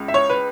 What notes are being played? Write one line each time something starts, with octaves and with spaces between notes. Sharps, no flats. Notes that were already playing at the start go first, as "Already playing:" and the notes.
Already playing: C#2 C#3
E5
C#5
B4